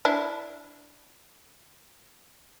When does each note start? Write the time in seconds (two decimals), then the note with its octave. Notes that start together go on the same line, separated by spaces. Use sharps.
0.05 D4 E4